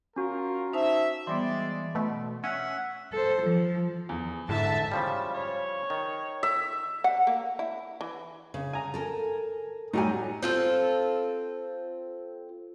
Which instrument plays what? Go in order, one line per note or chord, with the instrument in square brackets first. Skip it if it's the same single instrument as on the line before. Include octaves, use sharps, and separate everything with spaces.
[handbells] C#4 F#4 [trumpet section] F4 A#4
[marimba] D#4 C5 A5 [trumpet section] E5
[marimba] E3 G3 B3 [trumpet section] G#3 D5 [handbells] C6
[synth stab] B2 A3
[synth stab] C#4 [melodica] E5 F#5
[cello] A4 C5
F3
[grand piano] E2
[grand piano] G1 D3 E3 [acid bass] G#2 [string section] E5 A5
[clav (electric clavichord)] C#3 F3 G3
[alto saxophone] C#5
[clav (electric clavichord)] D#3
[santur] E5
[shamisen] F#5
A#3
E4
E3
[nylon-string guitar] C#3
[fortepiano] G#5 A#5
[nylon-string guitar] A4 A#4
[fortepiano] A2 F#3 G3 [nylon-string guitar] D#4 F#5 G#5
[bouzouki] C4 F4 A4